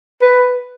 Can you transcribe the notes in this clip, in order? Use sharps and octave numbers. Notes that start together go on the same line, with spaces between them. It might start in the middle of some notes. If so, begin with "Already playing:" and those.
B4